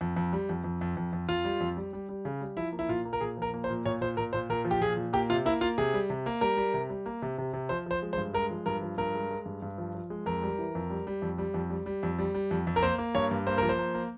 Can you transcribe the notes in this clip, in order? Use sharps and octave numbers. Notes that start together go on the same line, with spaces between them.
F2
F2
G3
F2
F2
F2
F2
F2
F2 F4
G3
F2
G3
G3
G3
C#3
G3
F3 E4
A#3
E4
A#2 F4
A#3
A#4
A#2 G#4
F3 A#4
A#3
C5
A#2
A#2 C#5
A#2 C5
A#2 A#4
A#2 C5
A#2 A#4
F3
G4
A#2 G#4
A#2
A#3 G4
C3 F4
A#3 E4
A#3 F4
C3 G#4
G3
C3
A#3
G3 A#4
G3
C3
G3
A#3
C3
C3
C3
F3 C5
F3 C5
G#3
C5
G2
G#3 A#4
F3
G2 A#4
F3
G2 A#4
G#3
G#3
G2
G2
F3
F3
G#3
F2 A#4
G3
E3
F2
G3
G3
F2
G3
F2
G3
G3
F2
G3
G3
F2
F2
A#4
A#3 C5
A#3
G2 C#5
G2
A#3 C5
F3 A#4
C5
A#3
A#3